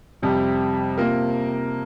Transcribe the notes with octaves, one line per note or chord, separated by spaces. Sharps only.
F2 C3 G3
C3 A#3 F4 A#4